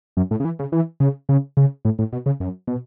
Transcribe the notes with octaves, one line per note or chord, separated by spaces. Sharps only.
F#2
A2
C#3
E3
C#3
E3
C#3
C#3
C#3
A2
A2
B2
C#3
F#2
B2